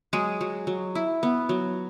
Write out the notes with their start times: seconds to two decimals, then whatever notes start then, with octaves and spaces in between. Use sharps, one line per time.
0.13 F#3 G#3 G#4
0.41 F#3
0.67 F#3
0.95 E4
1.23 B3
1.49 F#3